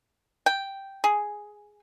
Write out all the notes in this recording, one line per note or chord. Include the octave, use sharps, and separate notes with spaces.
G5
G#4